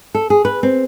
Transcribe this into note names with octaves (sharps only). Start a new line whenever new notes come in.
A4
G#4
B4
C4